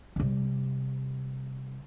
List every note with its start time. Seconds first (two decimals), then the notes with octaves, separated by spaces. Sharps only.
0.16 C3 G3